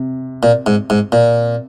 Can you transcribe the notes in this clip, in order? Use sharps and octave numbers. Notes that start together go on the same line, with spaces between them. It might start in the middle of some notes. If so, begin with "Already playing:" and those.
Already playing: C3
A#2
G#2
G#2
A#2